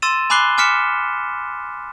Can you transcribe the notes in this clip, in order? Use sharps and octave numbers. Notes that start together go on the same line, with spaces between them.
C6 E6 A6 D#7 E7
G#5 B5 D6 F#6 C7 G7
G#5 D6 F6 B6 C#7 E7